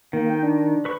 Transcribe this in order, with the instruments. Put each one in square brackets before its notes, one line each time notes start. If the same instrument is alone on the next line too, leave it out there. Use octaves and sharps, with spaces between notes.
[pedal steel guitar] D#3 [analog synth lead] A#3
[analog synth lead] G5
D4
[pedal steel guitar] B4 C#6